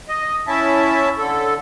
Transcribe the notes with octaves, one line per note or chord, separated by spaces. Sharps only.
D#5
C#4 E4 E5 A5
D3 A4